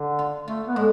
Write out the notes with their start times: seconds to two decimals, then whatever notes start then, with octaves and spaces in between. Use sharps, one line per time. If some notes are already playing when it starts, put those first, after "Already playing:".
Already playing: D3
0.19 F4
0.47 A3 F4
0.67 B3
0.76 A2 G#3